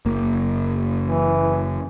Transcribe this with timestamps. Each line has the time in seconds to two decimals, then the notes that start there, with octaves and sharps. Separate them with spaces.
0.06 F#1 A#3
1.03 E3